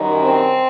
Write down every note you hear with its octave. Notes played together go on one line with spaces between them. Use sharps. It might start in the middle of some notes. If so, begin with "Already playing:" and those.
Already playing: F#2 D#3 G3
C4